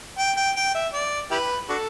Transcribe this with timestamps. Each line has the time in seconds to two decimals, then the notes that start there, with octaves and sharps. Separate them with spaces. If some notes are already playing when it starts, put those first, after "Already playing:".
0.18 G5
0.37 G5
0.56 G5
0.74 E5
0.94 D5
1.31 E4 G4 B4
1.69 D4 F#4 A4